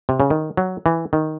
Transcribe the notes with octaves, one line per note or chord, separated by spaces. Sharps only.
C3
C#3
D#3
F#3
E3
D#3